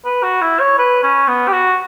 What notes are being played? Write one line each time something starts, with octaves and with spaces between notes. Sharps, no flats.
B4
F#4
E4
C#5
B4
C#4
B3
G4
F#4